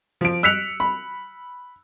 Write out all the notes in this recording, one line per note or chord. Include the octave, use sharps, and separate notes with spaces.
F3 D7
E6 F#6 B6 C#7 F7
B5